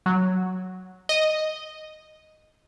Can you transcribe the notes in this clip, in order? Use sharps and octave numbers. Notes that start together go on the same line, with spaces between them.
F#3
D#5